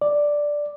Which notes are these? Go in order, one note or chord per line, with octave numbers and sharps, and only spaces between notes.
D5